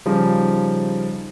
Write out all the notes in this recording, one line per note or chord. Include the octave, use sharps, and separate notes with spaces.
C#3 F3 G3 D#4 C5